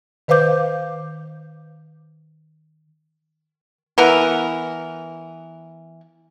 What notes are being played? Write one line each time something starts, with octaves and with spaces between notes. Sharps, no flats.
D#3 B4 C5 F5 D6 G6
E3 B3 A#4